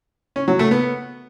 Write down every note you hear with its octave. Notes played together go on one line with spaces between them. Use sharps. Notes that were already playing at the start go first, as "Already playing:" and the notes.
C#4
F#3
A3
B3